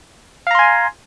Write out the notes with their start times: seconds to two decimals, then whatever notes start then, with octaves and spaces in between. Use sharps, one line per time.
0.47 F5
0.51 A#5
0.55 C6
0.59 G#5